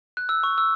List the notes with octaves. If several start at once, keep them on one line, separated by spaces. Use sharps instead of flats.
F#6
E6
C#6
E6